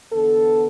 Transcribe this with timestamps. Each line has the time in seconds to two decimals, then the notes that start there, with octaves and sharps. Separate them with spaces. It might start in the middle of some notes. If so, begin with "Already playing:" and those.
0.12 E2 D3 B3 A4